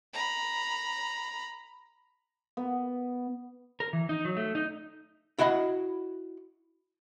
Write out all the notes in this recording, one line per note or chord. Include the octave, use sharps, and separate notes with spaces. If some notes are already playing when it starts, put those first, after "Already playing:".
A#5 B5
B3
A#4
E3
D#4
F#3
A3
D#4
E4 F#4 D#5 F#5 B5